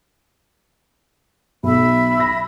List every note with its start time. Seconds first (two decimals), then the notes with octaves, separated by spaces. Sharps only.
1.63 B1 E5 B5
2.17 E6 A#6